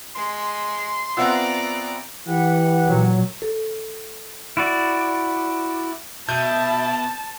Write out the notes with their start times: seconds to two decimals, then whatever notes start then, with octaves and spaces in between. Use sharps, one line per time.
0.15 G#3 C6
1.17 B3 C4 F4 D5 E5 F#5 A#5 E6
2.28 E3 G4 B4 F#5
2.85 A#2 F#3
3.42 A4
4.57 E4 F#4 D5
6.29 B2 E5 A5 G6